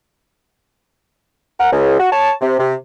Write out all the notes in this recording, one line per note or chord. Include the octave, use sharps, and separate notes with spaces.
A#4 F#5
C#2
F#4
C#5 A5
C3
C3